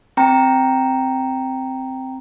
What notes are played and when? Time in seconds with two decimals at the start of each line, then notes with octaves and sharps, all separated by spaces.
0.17 C4 G5 A#5